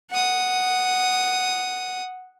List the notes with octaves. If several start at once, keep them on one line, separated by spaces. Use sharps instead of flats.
F#5 D#6